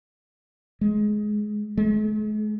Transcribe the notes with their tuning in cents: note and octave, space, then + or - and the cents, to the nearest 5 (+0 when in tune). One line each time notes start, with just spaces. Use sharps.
G#3 +15
G#3 +45